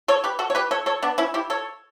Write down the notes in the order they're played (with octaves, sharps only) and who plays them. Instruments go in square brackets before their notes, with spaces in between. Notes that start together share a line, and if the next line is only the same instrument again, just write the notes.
[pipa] A4 C#5
G4 B4
F#4 A4
C#5
G4 B4
A4 C#5
A4 C#5
B3 D4
C#4 E4
E4 G4
A4 C#5